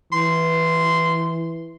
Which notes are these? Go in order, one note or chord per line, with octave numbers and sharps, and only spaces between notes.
E3 C6